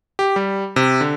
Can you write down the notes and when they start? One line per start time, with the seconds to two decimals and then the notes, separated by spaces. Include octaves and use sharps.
0.19 G4
0.36 G3
0.76 C3
1.01 D3